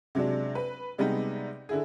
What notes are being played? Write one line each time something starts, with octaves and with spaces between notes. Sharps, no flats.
C3 F#3 G#3 D4
B4
C3 G3 G#3 B3 D#4
D3 E4 G#4